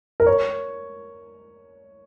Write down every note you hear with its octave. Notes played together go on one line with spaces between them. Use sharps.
A#4
C#5